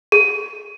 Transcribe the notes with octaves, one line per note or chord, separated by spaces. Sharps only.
G#4